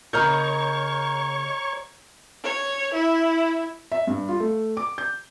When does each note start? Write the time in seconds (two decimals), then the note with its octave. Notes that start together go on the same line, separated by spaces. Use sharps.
0.13 C#3 A#3 C#5 D#5 A#5 C#6 F6 G6
2.44 C#5
2.94 E4
3.92 E5
4.07 G2
4.28 F4
4.40 A3
4.77 D6
4.98 G6